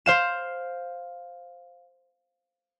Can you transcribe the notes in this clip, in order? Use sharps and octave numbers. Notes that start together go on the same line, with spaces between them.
C5 F5 E7